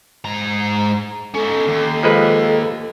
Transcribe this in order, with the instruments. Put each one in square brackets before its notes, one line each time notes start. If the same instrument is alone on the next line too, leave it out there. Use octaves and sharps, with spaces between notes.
[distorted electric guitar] G#2 A#5
[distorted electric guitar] C#4 D#4 [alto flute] A4
[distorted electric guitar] D#2
[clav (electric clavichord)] F3 G#3 B4 [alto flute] A4